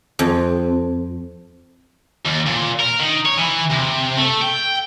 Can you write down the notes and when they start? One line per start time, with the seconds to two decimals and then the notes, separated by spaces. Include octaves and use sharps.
0.19 F2
2.25 D#2
2.46 A#2
2.80 A#4
2.99 D#3
3.26 C#5
3.38 E3
3.72 C3
4.17 A3
4.41 G5